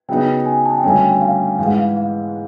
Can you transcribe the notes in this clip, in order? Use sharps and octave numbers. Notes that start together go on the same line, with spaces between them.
C#3 F#3 B3 D#4 G5
G#5
A5
G5
G2 D3 F#3 A3 C#4 G#5
G5
F5
G#2 E3 G#3 F5
F#5
F5
F5